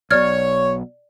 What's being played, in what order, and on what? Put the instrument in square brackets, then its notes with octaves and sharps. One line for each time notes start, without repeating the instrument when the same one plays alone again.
[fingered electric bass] B1 B2 [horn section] C#5 [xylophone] D5 F6 G#6